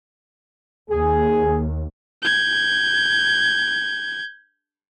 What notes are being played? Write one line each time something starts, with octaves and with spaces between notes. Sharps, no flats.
D#2 G#4
G6 G#6